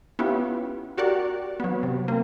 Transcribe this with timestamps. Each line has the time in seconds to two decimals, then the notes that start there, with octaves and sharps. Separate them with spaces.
0.19 B3 C#4 E4 F4 G4
0.98 F#4 G4 A#4 D5 F#5
1.60 F#3 B3
1.83 C3
2.08 A#3 C4